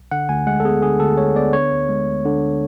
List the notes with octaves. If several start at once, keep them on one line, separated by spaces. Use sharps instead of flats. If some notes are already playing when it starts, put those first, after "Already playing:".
Already playing: B1
D3 F#5
D2 G#5
G#3 F#5
A4
B3 G#4
D3 G#4
D2 A4
G#3 C#5
B3 D5
D3 C#5
D2
G#3
D2
D3